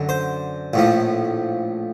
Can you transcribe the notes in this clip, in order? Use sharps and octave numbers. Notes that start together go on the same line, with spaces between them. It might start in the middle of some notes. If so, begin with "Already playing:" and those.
Already playing: F#2 D3 F#3
C5
A#1 A2 F3